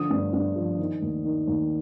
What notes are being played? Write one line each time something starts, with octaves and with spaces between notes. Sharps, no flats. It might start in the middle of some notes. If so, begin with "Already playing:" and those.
Already playing: D3 F3 D#6
G2
G2
F3
D#3
D#2
D#3
D#2